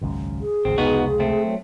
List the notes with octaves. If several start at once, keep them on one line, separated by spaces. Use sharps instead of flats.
G#1 C#2 F#2
G#4
G#1 C#2 C4
F1 C#2 B3 D#4 F#4
A3 C4
F#3